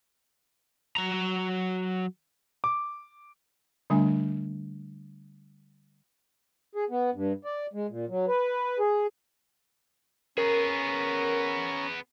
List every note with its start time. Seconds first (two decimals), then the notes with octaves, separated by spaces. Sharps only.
0.97 F#3 A#5
2.64 D6
3.90 D3 G3 A3 D4 G#5
6.75 G#4
6.90 B3
7.14 G2
7.44 D5
7.73 G#3
7.89 A#2
8.09 F#3
8.28 B4
8.79 G#4
10.38 B3 C#4 G#4 A#4 A#5